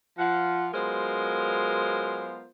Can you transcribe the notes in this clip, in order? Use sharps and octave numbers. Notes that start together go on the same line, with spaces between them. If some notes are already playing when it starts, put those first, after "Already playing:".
F3 F4 F#5
F#3 G#3 B3 F4 A#4 C5